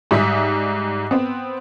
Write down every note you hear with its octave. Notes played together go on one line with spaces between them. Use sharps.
G#2 G3 E5 D#6 B6
B3 C4